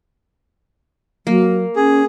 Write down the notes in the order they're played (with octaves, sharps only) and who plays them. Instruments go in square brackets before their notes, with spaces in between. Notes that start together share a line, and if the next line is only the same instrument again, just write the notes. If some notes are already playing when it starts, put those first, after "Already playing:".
[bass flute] F#3 [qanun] A#3
[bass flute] C#4 [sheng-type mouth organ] G#4